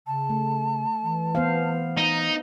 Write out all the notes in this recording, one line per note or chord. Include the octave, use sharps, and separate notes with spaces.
C#3 A5
A3
E3
B3 C5 F5
D#4